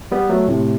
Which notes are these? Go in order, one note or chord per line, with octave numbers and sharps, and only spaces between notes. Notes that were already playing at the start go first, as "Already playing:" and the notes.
G3 B3
F#3 A3
A2 C3